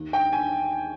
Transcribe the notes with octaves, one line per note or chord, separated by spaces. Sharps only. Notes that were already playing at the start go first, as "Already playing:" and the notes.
Already playing: D#2
G5
G#5